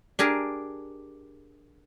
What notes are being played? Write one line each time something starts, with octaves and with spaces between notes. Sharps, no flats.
D4 G4 G#4 A#4